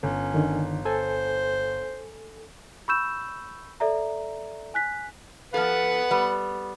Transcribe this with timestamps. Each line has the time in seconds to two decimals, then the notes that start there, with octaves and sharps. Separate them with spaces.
0.03 G1 C#4
0.34 D3 D#3
0.85 A4 C5 G#5
2.88 B5 C#6 E6 G6 E7
3.80 A4 D5 E5 A#5
4.74 G#5 F#6 B6
5.54 F3 A4 B4 F#5
6.11 G3 B3